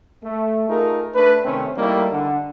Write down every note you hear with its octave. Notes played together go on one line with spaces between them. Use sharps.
A3
A3 D#4 F4 G#4 A#4
A3 D4 B4
C3 D#3 A3 C4 C#4
G3 A3 A#3 D#4 E4
D3